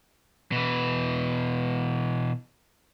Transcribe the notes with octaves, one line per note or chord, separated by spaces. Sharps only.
B2 E3